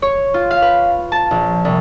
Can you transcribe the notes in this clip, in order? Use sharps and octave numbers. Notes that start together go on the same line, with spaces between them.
C#5
F4
F5
B4
A5
A#1
C2